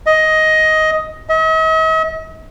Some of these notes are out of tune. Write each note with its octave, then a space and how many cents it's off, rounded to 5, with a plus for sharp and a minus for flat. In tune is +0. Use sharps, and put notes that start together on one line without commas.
D#5 +10
D#5 +45